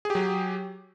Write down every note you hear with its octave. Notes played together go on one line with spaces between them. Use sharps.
F#3 G4 G#4